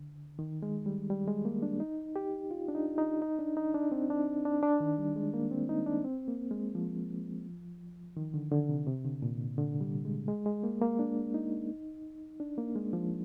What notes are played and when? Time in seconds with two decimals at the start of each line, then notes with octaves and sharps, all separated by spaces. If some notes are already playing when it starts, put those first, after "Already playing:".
Already playing: D3
0.39 D#3
0.63 G#3
0.86 G3
1.10 G3
1.27 G#3
1.45 A#3
1.62 D4
1.80 D#4
2.16 G4
2.51 F4
2.68 D4
2.75 D#4
2.98 D#4
3.22 D#4
3.39 D4
3.57 D#4
3.74 D4
3.92 C4
4.10 D4
4.45 D4
4.63 D4
4.80 D#3
4.98 G3
5.16 G#3
5.34 A#3
5.51 C4
5.69 D#4
5.86 D4
6.04 C4
6.28 A#3
6.51 G#3
6.75 F3
8.17 D#3
8.34 D3
8.51 D3
8.69 C3
8.87 C3
9.05 D3
9.22 A#2
9.58 D3
9.81 G3
10.05 G#3
10.28 G#3
10.46 G#3
10.64 A#3
10.81 A#3
10.99 D4
11.34 D#4
12.40 D4
12.58 A#3
12.75 G#3
12.93 F3